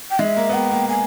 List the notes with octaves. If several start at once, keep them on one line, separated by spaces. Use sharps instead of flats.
G5
G#3 E5
A#3
B3
A#3 G5
A#3
G#5